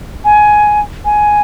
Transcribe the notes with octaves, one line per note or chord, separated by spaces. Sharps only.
G#5
G#5